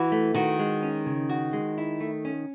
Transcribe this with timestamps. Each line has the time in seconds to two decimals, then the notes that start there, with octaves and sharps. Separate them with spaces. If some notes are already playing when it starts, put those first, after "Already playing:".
Already playing: E3 F#4
0.12 A3
0.35 D#3 F#4
0.59 G#3
0.83 C#4
1.06 C#3
1.30 F#4
1.53 G#3
1.78 E4
2.00 A3
2.25 C#4